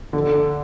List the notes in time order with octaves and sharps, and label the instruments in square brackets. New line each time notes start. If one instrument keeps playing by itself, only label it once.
[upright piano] D3